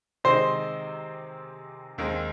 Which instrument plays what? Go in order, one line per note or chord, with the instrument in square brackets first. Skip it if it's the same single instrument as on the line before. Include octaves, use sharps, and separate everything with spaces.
[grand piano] C3 D#3 G#3 C4 D#4 [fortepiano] C5
[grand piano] D#2 D#3 G#3 C4